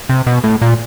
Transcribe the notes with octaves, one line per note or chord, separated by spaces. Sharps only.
C3
B2
A2
A#2